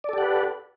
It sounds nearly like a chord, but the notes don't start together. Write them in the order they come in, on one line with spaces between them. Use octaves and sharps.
D5 A4 G4 F#5 B4